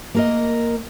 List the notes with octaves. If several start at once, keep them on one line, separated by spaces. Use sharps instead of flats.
A#3 A#4 D#5